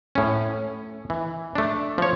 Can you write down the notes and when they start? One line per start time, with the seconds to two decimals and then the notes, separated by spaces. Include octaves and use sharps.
0.15 A2 C#4
1.10 E3
1.55 A3 D4
1.98 F3 C#5